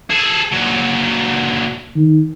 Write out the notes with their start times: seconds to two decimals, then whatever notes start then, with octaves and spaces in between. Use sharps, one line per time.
0.10 G#4 A4
0.52 A#2 F#3
1.96 D#3